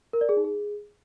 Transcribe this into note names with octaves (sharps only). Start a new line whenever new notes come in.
A#4
D5
G#4
D#4
G#4